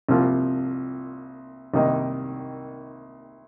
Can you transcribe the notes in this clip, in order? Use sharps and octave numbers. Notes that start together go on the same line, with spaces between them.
C2 C3 F3 A#3 F4
C2 C3 D#3 A#3 D#4